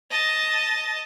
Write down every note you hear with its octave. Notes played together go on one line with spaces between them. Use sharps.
D#5 A5